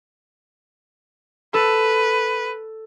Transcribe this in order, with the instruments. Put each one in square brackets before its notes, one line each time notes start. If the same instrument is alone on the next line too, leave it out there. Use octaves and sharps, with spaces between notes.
[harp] A4 [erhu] B4